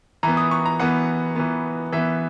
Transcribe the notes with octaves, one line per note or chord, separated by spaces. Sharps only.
E3 B3 A#5
D#6
C#6
A#5
E3 B3 F#5
E3 B3
E3 B3 E5